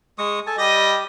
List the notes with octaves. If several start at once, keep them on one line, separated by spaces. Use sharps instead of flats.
G#3 C#6 D#6
A4 G#5 A5
G3 G4 D#5